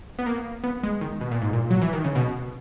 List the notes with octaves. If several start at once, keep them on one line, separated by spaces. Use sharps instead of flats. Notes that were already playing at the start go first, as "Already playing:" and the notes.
B3
A#3
B3
G#3
D#3
B2
A#2
G#2
A#2
F#3
E3
D#3
C#3
B2